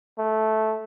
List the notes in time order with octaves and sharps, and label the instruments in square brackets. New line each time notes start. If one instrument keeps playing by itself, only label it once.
[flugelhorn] A3